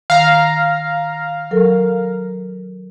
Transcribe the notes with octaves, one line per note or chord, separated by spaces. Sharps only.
D#3 F5 A#5
F#3 A4 A#4